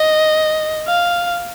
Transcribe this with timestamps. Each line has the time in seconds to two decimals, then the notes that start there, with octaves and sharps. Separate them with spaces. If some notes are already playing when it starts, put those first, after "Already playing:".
Already playing: D#5
0.88 F5